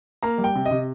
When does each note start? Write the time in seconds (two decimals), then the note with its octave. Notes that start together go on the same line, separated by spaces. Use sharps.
0.23 A#3 A#5
0.38 G3
0.44 G5
0.55 C3
0.66 D#5
0.71 C3